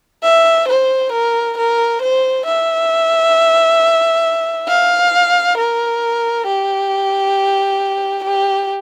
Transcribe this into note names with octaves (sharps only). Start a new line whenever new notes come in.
E5
C5
A#4
A#4
C5
E5
F5
A#4
G4
G4